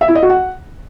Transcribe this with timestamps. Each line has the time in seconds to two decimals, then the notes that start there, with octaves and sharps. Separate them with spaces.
0.01 E5
0.08 E4
0.15 D#5
0.22 F#4
0.30 F#5